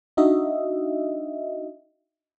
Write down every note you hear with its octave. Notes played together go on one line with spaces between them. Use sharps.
D4 D#4 F#4 D#5 E5